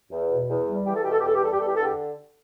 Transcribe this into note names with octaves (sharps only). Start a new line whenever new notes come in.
E2
B2
E2
G3
E2 G4
A4
B2 G4
A4
G4
E2 A4
G4
G3 A4
G4
E2 A4
G4
A4
D3 G4